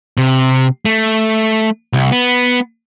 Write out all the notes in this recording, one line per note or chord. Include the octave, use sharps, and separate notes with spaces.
C3
A3
C2
B3